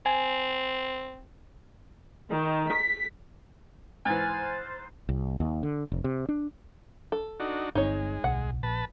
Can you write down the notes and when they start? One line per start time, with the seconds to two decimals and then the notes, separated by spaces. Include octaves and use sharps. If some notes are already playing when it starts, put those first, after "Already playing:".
0.06 C4 G#5
2.32 D#3
2.71 B6
4.06 G#2 E3 C5 G#5 F6 F#6 A6
4.26 C5
5.09 C2
5.40 D#2
5.63 D3
5.92 F1
6.04 C3
6.29 D4
7.12 A4
7.40 D4 D#4 F#4
7.75 G1 G#3 C4 D#4 C#5
8.24 D1 B1 F#5
8.63 A#1 B4 A5